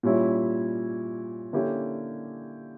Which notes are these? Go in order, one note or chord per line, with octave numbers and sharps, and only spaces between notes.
A#2 G3 C#4 E4
D3 A#3 C#4 E4 G4